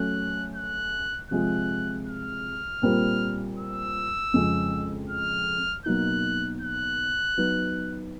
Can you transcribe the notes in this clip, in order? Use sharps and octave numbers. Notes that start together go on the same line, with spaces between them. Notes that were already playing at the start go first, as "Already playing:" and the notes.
Already playing: F#3 A3 C#4 F#6
F#6
C3 F3 G#3 F#6
F6
A#2 G3 C4 F4 A#4
E6
F2 C#3 F3 G#3
F6
B2 F#3 A#3 D#4 F#6
F#6
F#3 B3 D#4